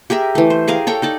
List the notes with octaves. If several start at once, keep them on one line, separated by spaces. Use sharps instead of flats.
G4 G#4 A#4 E5
E3 A3
C5
G4 G#4 A#4 F5
A4 C#5 G5
D#4 A4 D5